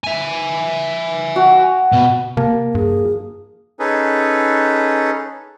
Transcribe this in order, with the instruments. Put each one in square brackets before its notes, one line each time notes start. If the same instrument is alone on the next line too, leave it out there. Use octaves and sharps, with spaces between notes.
[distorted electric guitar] E5 G#5
[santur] F#4
[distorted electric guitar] B2
[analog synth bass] C3 [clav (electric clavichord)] A#3 A5
[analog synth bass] G2 [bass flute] G#4
[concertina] C#4 D#4 G#4 A4 B4